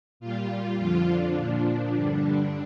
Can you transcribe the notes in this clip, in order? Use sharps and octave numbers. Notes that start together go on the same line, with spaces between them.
A#2 G3 F4
F2 D3 F3 F4
D4
A#2 F3
D4
G2 D3 G3